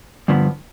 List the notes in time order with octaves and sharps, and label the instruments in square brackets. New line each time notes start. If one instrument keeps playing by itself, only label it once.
[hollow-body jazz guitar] G2 D3 F3 B3